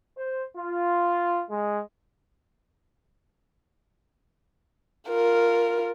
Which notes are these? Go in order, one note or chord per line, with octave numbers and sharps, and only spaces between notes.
C5
F4
G#3
F4 A#4